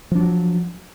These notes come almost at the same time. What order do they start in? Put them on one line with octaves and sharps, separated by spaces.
F3 D4 F#3